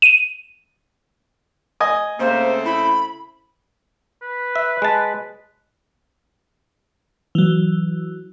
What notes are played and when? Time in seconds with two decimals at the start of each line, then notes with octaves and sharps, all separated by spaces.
0.02 D#7
1.80 D#5 G#5 D#6
2.20 C#3 A3 A#3 C4 C5
2.66 E4 B5
4.22 B4
4.56 E5
4.82 G#3 A5
7.35 E3 F#3